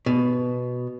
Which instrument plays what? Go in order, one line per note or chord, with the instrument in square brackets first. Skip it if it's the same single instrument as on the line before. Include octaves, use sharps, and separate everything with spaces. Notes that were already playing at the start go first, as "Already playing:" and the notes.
[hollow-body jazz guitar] B2